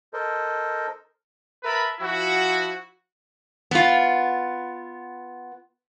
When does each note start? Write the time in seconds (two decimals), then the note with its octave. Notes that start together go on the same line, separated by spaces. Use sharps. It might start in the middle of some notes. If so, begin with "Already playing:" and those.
0.13 A4 A#4 C5 D#5
1.64 A#4 B4 E5 A5 B5
2.00 F3 E4 F#4
3.71 B3 F4